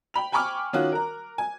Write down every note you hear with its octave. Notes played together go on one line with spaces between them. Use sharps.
G5 B5 F7
G5 G#5 B5 C#6 D6 F6
D#3 C#4 F4 F#4 F#6
A#4 A#5
G#5